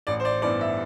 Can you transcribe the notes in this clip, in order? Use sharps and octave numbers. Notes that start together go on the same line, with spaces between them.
A1 D5
C5
D5
G2 E3 B3 D5
E5